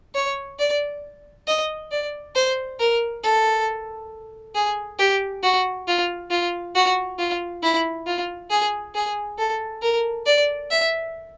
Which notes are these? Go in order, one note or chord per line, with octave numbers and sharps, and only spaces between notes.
C#5
D5
D#5
D5
C5
A#4
A4
G#4
G4
F#4
F4
F4
F#4
F4
E4
F4
G#4
G#4
A4
A#4
D5
E5